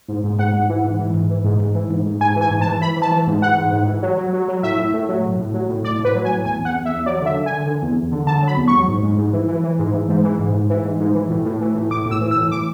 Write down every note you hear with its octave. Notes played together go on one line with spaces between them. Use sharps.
G#2
G#2
G#2 F#5
G#2
E3
G#2
E3
G#2
E3
G#2
G#2
E3
G#2
G#2
G#2 G#5
E3
G#5
G#2
A5
E3
E3 B5
E3
A5
E3
G#2
E3 F#5
G#2
G#2
E3
F#3
F#3
F#3
F#3
A2 E5
A2
A2
F#3
A2
A2
F#3
A2
A2 D5
A2
B4
F#3
G#5
A2
E2 G#5
E2 F#5
E2
E5
E2
F#3 D5
D3 E5
D3
G#5
D3
D3
E2
E2
D3
D3 A5
F#3
B5
E2
C#6
F#3
G#2
G#2
G#2
E3
E3
E3
G#2
E3
G#2
E3
G#2
G#2
E3
G#2
G#2
E3
A2
A2
E3
A2
A2 D6
A2
E6
E3
E6
A2
E3 D6